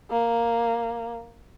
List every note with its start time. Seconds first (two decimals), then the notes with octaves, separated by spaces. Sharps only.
0.10 A#3